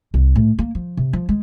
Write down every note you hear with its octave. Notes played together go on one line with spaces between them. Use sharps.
C2
A2
A#3
F3
C3
F3
G#3